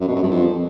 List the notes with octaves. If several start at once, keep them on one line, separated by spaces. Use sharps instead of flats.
F#2
B2
F#2
G2
F2